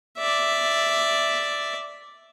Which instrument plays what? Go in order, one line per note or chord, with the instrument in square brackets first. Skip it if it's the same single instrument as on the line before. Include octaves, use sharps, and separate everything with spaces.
[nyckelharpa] D5 E5